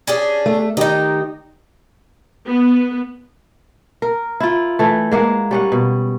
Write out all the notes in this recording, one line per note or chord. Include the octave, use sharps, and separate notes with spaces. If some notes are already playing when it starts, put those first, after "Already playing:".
C#4 D4 G#4
A3
D#3 D#4 G4 D#5
B3
A#4
E4 F4
E3 A3
G#3 A#3 E5 F#5
G3 C#4 F#5
B2